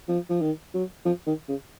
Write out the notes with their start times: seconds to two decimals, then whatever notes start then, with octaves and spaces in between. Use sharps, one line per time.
0.09 F3
0.30 F3
0.41 D#3
0.74 F#3
1.05 F3
1.27 D#3
1.48 C#3